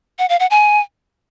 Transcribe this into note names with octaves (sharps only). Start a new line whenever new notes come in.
F#5
F5
F#5
G#5